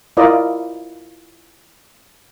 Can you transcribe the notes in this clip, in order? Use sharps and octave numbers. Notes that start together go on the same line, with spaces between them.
E4 F4 A#4 D5 D#5